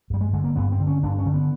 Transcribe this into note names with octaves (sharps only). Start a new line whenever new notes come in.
G2 G3
G#3
D3 G#3
A#3
G2 B3
C4
D3
C#4
G2 D4
C#4
D3
B3